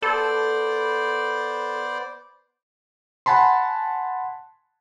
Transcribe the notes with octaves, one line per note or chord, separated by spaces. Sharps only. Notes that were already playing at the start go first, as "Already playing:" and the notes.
B3 A4 C5 D5
F#5 G#5 A5 B5 C6